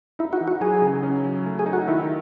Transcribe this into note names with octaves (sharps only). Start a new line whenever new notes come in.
D#4 E4
F#4
E3
F#4
F#3 G#4
C#3
C#4
F#3
A3
G#4
D#4
F#4
D#3 E4